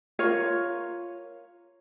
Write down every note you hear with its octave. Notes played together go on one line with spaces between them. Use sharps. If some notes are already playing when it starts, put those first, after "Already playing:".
F4 A#4 C#5